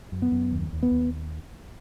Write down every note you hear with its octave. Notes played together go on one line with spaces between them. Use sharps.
F#2
B3
F#2
D#2
D#2
B3
D#2